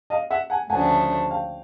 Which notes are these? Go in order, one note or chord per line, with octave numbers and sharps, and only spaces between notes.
D#5 F5
E5 F#5
F#5 G#5
D2 C#3 F3 A3 D4 F#5 G#5
F5 G5